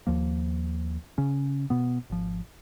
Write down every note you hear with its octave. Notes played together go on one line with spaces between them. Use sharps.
D#2 F3 A#3
C#3 C#4
B2 B3
G#1 F3